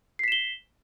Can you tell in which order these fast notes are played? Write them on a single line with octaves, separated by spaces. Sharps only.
C7 B6 E7 G7